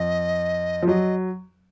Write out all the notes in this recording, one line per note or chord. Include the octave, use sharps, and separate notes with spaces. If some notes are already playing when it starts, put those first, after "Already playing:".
Already playing: F2 D#5
F3
F#3 D#5